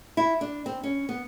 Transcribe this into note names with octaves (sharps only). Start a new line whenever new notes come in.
E4
D4
C4
C#4
B3